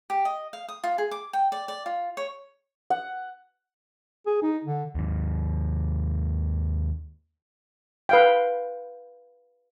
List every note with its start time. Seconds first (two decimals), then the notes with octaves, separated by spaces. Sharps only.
0.10 G4
0.25 D#5
0.53 F5
0.68 D#6
0.84 F4
0.98 G#4
1.11 D6
1.33 G5
1.52 D5
1.68 D5
1.86 F4
2.17 C#5
2.90 F#5
4.26 G#4
4.42 D#4
4.64 D3
4.95 D#2 G#2
8.09 B4 F5 G5